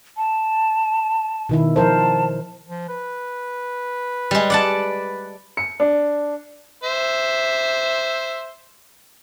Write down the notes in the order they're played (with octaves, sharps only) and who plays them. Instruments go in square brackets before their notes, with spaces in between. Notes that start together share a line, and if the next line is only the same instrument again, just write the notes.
[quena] A5
[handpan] B2 D#3 E4
[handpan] F3 A#4 C5 [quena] A5
[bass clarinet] F3
B4
[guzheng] G3 G#3
D5 F#5 A5
[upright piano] C#7
D4
[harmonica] C5 E5